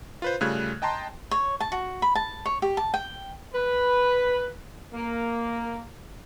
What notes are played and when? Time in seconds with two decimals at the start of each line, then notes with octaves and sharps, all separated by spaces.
0.22 F4 B4 C5
0.41 C#3 G3 A3 F4 F#6 G#6
0.82 D#5 G5 A5 A#5 C6
1.31 C#5
1.60 A5
1.72 F#4
2.02 B5
2.15 A5
2.45 C#5
2.62 G4
2.77 A5
2.94 G5
3.54 B4
4.94 A#3